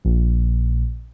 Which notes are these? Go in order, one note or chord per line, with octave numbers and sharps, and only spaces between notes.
A#1